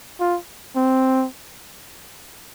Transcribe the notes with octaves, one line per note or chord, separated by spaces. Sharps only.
F4
C4